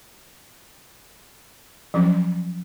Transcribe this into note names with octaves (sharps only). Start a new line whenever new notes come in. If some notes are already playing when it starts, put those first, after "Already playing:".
F3 F#3 C#4